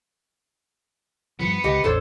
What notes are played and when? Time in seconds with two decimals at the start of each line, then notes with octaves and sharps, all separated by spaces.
1.39 G2 F3 B3 C#7
1.64 C#2 G4 D#5
1.84 A1 E2 D4 A4 C5 C#5